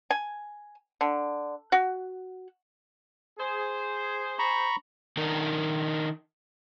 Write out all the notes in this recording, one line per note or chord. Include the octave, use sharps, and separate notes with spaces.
G#5
D3
F#4
G#4 C5
A#5 B5 C#6
D#3 D4 D#4 A#4